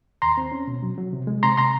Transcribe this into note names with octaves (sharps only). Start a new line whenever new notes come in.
D#2 A#5 C6
C4
C#4
B2
F#3
F#3
C3
G#3
C3 A#5 C6
C3 A#5 C6